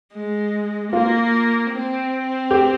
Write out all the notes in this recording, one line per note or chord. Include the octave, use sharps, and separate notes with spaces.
G#3
A#3 F4
C4
G4